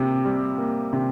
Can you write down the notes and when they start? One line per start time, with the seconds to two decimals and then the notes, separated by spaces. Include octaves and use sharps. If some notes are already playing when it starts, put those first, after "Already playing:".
Already playing: C3 A#3
0.25 G3
0.58 A#3
0.93 C3